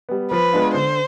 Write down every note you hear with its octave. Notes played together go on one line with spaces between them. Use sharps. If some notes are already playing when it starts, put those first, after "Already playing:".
G3 B3
F3 B4
G#3 B3 D4 F4
D3 C5